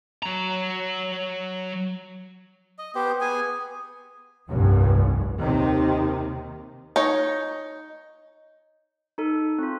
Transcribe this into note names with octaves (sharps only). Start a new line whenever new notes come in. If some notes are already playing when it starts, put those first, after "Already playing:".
F#3 A#5
D#5
B3 G4 C5
B3 G#4 G#5
F1 C2 G2
D#2 C3 D#3
D#4 C#5
D#4 A4
C4 F4